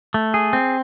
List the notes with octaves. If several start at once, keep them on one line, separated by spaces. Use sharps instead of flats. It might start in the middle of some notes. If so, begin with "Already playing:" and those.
A3
G#4
C4